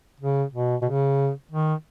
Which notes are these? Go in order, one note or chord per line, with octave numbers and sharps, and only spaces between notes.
C#3
B2
B2
C#3
D#3